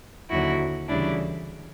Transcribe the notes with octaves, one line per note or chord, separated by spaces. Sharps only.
D#2 D3 F#3 E4 F#4
D2 C#3 E3 G3 D4 E4